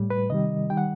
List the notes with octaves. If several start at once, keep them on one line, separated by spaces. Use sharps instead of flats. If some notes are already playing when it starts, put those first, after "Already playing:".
Already playing: A2 G3
B4
C3 D#3 G3 D#5
D#3 G3 G5
F#5